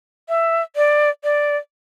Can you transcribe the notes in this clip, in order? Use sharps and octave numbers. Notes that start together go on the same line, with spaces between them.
E5
D5
D5